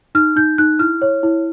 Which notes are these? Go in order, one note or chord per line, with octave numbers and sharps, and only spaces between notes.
D#4 F6
D#4 G6
D#4 F#6
E4 F6
C#5
E4